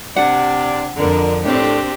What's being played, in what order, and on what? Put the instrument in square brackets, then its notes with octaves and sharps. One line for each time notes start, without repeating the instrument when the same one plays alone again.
[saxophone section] C3 D4 [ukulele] F#5
[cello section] F2 [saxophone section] D3 [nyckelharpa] A#4
[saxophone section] A2 [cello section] C4 D4 [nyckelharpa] G4